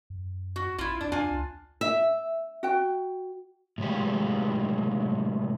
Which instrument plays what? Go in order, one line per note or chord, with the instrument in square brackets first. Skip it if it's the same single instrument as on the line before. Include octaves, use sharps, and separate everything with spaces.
[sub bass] F#2
[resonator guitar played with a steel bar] F#4
[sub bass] A#1 [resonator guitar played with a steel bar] E4 F4
[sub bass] F2 [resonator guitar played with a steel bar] D4
[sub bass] F2 [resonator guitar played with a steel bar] D4 F4 G#5
[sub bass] C#2
[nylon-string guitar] E5
[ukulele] F#4 G5
[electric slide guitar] A2 C3 F#3 G#3 G4